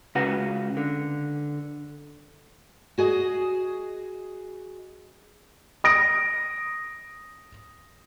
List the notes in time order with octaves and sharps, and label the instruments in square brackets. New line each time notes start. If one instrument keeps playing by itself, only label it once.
[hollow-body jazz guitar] C#2 C#3 F#4 B4 F#5 A#5
D3
[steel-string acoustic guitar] F#4 G#4 D#5
[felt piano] D#6 A#6 D7